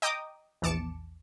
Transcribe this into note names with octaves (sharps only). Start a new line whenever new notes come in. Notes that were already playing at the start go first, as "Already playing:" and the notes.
D#5 G5 A#5 D6 D#6
A#1 E2 A5 D6 C#7 E7